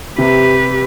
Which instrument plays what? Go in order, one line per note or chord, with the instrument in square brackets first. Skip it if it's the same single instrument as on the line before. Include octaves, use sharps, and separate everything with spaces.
[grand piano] C3 [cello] G4 B4